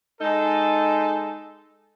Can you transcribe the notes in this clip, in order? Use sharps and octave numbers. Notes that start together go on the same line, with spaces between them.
G#3 D#4 A4